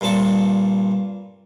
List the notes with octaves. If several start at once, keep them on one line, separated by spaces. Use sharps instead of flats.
G2 A#2 C4 A5 C#6